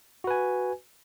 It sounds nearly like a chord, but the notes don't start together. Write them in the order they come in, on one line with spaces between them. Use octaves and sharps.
F#4 B4 G#5